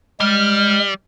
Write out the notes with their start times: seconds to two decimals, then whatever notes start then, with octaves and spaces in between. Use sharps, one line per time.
0.20 G3 G#3 F6